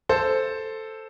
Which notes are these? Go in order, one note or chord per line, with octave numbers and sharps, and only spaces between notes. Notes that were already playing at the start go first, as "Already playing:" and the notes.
A4 C5